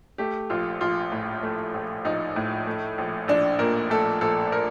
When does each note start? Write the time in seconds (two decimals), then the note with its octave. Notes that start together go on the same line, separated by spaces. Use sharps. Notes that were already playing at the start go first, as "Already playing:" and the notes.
0.18 A3 G4
0.50 A#1 F4
0.81 A#1 F4
1.12 A2
1.43 A3
1.74 A#1
2.05 A#1 D#4
2.36 A2
2.67 A3
2.98 A#1
3.28 A#1 D4
3.59 A#2 A#4
3.90 A3 A4
4.21 A#1 A4
4.52 A#4